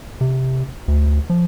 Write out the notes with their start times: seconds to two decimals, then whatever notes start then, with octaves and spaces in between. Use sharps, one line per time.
0.21 C3
0.88 D2
1.30 F3